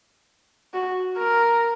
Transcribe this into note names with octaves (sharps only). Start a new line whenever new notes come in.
F#4
A#4